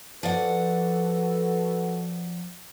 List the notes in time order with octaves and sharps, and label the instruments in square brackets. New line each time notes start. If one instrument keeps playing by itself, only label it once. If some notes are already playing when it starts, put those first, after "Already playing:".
[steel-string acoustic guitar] F3 D5 F#5 [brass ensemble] F#4 A4 B4